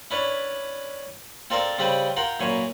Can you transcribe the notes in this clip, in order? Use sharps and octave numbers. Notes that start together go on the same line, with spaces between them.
C#4 D4 E4 B4 C#5
C4 F4 A4 A#4 C5 D5
C#3 G3 C4 G4 B4 C5
F4 A#4 F#5 G5
F#2 A#2 E3 C#5 G#5